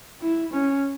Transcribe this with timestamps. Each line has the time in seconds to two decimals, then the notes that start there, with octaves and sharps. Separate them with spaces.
0.22 E4
0.53 C#4